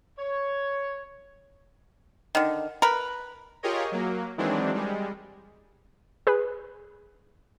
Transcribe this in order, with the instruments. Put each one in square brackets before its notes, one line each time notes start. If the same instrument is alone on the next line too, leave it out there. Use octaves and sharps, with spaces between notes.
[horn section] C#5
[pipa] D3 D#3
A#4 B4
[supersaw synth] F4 G4 G#4 A#4 C#5 D#5
F#3 A#3
D#3 E3 F#3 G#3 C4 D4
G3 G#3
[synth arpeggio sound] G#4 B4